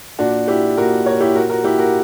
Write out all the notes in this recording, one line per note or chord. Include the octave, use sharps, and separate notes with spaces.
A#2 D4 F#4
E4 G4
A#2 F#4 A#4
A#4 C#5
E4 G4
A#2 F#4 A#4
F#4 A#4
E4 G4
F#4 A#4